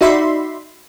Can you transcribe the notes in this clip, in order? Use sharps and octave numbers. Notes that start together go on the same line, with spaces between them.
D#4 F#4 D5 E5 B5 C6